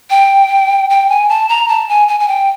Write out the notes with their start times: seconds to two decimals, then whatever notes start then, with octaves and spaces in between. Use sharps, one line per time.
0.10 G5
0.90 G5
1.09 G#5
1.29 A5
1.49 A#5
1.68 A5
1.89 G#5
2.08 G#5
2.20 G#5
2.28 G5